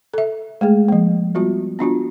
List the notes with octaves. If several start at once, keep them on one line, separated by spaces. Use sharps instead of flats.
A4 E5
G#3 A3 G#4
F3 A#3
G3 B3 F4 F#4
B3 D4 F4 F#4